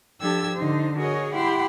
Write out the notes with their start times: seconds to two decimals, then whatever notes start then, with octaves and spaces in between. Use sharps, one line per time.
0.19 F3 D4 G4 A4 E6 G#6
0.56 D3 D#4 C5
0.96 F#4 G#4 A#4 C#5 D#5
1.32 E4 G4 F#5 G5 B5 C6